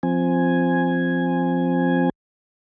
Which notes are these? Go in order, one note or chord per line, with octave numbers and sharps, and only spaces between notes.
F3 C4 G#5